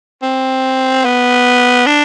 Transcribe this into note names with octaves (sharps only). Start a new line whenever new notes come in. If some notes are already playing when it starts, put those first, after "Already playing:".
C4
B3
D4